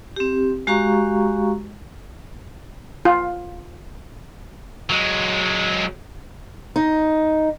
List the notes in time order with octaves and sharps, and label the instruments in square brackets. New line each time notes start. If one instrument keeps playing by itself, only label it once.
[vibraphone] C4 G4
G#3 F#4 G4 F5 A#5 C#6
[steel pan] F4
[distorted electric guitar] F#3 G#3
[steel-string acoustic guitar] D#4